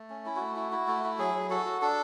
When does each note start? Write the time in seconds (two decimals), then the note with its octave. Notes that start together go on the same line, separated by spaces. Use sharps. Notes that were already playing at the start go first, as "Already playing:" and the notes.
Already playing: A3
0.10 C#4
0.26 E4
0.36 A3 F#4
0.56 E4
0.72 E4
0.87 A3
1.04 E4
1.19 F#3 G#4
1.35 F#3
1.50 F#4 A4
1.66 F#4
1.82 D4 A4